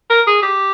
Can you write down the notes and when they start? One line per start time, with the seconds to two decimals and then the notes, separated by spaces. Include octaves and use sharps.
0.10 A#4
0.27 G#4
0.43 G4